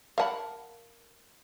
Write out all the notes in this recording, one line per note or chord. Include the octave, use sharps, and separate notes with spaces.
A#4 F5 F#5 A5 B5